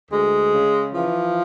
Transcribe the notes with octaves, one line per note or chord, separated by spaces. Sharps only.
D2 G#3
C#3
E3 F3